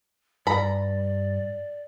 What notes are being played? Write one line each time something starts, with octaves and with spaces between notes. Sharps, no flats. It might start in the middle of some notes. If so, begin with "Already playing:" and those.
G2 D5 A#5 B5